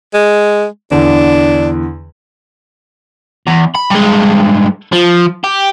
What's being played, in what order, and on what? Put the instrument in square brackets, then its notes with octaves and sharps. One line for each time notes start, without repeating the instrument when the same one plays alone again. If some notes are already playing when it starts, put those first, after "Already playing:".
[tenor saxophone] G#3
[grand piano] E2 D3 E3 [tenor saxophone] D4
[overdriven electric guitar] E2
B5
G2 G#3
F3
G4